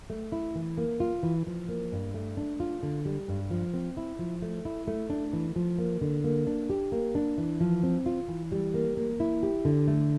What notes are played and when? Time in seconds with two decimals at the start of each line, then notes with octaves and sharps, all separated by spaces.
0.10 A3
0.32 E4
0.55 E3
0.78 A#3
1.00 F4
1.23 E3
1.47 F3
1.69 A#3
1.92 G2
2.14 A3
2.37 D4
2.60 F4
2.83 D3
3.05 G3
3.28 G2
3.51 F3
3.74 C4
3.97 E4
4.19 F3
4.42 A3
4.65 E4
4.88 A3
5.10 D4
5.33 E3
5.56 F3
5.78 A#3
6.01 D3
6.24 A#3
6.47 D4
6.70 G4
6.92 A#3
7.15 D4
7.38 E3
7.60 F3
7.83 C4
8.06 F4
8.28 E3
8.52 G3
8.74 A#3
8.97 A#3
9.20 E4
9.43 G4
9.65 D3
9.88 A3